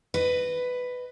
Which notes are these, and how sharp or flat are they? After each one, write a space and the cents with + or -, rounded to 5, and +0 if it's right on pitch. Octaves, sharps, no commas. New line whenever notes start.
B4 +10 D#5 -20